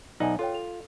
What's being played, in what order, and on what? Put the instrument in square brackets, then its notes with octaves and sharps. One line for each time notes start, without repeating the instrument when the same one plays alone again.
[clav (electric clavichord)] B1 D#4 F#5 [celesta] D5 E5 G#5
[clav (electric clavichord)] F4 [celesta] A4 C#5 G5
[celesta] A4 F7